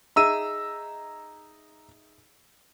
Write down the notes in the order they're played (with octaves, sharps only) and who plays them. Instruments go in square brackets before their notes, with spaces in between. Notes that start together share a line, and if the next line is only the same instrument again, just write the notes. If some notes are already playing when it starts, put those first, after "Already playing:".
[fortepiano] D#4 G#4 E5 [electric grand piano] A#5 E6 D#7